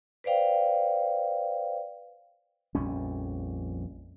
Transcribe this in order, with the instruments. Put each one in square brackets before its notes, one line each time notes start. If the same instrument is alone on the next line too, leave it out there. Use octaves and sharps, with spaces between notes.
[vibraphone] B4 C5 D5 F5 G5
[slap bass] A#1 F2 G3 C#4